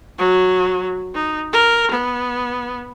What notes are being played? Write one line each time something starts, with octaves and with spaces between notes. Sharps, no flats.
F#3
D#4
A#4
B3